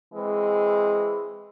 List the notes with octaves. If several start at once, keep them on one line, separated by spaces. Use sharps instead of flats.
E3 G#3 C4